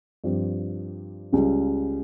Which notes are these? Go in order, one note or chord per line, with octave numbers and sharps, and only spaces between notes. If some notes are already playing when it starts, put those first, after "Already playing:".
G2 F3 C4 G4
C#2 C#3 G3